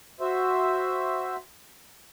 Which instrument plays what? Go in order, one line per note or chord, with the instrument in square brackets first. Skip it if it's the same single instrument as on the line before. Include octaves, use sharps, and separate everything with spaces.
[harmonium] F#4 C5 E5